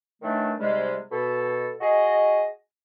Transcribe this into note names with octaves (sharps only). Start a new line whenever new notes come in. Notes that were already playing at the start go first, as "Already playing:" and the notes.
D#3 E3 F#3 A3 D4
G#2 C3 G3 G#3
B2 A4
F#4 G#4 D#5